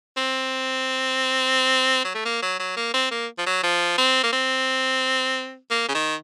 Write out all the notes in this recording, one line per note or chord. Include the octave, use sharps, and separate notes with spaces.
C4
F#3
A3
A#3
F#3
F#3
A#3
C4
A#3
F3
F#3
F3
C4
A#3
C4
A#3
C#3
D#3